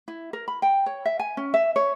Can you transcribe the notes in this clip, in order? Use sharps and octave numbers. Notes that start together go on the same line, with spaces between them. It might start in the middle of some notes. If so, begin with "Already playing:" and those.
E4
A#4
B5
G5
C#5
E5
G#5
C#4
E5
C#5